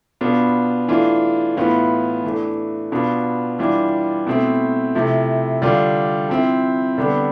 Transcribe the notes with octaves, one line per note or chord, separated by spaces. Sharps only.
B2 B3 D4 F4
E3 A3 D4 F4
A2 E3 B3 F4
E3 A3 D4
B2 B3 D4 F4
E3 G3 D4 F4
B2 A3 C4 E4
C3 F3 A3 E4
D3 G3 D4 F4
F3 C4 E4
D3 G3 B3 D4